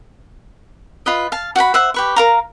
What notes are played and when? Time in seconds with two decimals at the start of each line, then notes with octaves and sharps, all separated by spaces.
1.06 F4 B4 D#5
1.32 F5 A5
1.56 F#4 F#5 G5 B5
1.74 C5 E5 F#5
1.94 G4 B4 C#6
2.16 A#4 F5 A#5